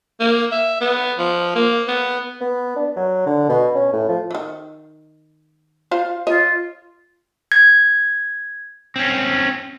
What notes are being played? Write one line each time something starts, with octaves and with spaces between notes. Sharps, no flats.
A#3
E5
B3
F3
A#3
B3
B3
D4
F#3
D3
B2
C#4
A2
F3
D#3 E3
F4 C5 F5
F4 C#5 D#5
G#6
C4 C#4